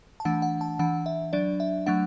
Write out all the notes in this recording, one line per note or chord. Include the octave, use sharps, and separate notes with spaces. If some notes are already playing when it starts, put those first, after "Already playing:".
A5
E3 A3 D4 F#5
F#5
A5
E3 D4 F#5
E5
F#3 D4 D5
E5
F#3 A3 D4 F#5